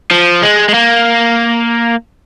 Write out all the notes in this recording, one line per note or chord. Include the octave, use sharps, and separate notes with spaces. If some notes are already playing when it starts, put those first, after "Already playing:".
F3
G#3
G#3
A#3